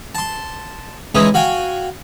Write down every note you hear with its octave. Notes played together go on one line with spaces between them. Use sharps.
A5 C6
E3 G#3 C#4 D#4 E4
F#4 F5 G5 G#5